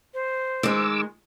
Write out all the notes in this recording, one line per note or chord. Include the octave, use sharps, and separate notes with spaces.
C5
D#3 G#3 D6 E6